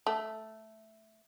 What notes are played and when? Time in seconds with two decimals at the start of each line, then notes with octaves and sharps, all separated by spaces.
0.07 A3